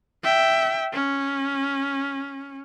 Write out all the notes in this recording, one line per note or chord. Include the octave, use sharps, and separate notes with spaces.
E5 G5
C#4